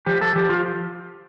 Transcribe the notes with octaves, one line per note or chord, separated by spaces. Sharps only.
F3 G4
A4
F3 G4
F4